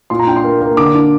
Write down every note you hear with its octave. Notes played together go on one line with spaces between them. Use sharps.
A#2 C6
A#5
D4 G5
C6
A#3
A#3
D3 D6
D4